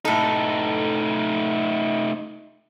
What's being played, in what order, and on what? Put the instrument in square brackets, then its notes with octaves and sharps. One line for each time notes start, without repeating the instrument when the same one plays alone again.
[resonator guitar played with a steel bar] A2 A4 [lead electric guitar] A3 D#4